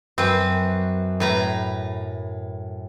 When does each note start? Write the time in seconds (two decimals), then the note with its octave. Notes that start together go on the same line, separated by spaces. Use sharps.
0.18 F#2 C4 B4
1.20 A2 B4 A#5